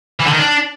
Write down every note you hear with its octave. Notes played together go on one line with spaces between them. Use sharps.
E3
D3
D#3
D4